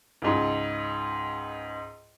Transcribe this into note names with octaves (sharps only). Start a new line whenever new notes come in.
C#2 G#2